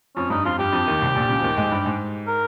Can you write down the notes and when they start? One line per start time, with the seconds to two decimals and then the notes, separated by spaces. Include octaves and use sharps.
0.16 F2 F3 C#4
0.30 G2 G3 D#4
0.45 F2 F3 F4
0.59 G2 G3 G4
0.72 F2 F3
0.87 D#2 D#3
1.01 C2 C3
1.15 A#1 A#2
1.29 C#2 C#3
1.40 F3
1.43 D#2 D#3
1.57 G#2 G#3
1.71 G2 G3
1.85 G#2 G#3
2.28 A#4